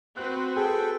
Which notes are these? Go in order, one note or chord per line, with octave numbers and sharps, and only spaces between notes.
C4 F#4 B4 F#6
G#4 A4 G5